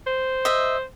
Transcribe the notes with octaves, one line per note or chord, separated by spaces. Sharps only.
C5
D#5 E5